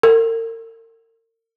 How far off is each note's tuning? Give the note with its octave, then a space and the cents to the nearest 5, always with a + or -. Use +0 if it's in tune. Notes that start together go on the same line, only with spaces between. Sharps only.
A#4 -40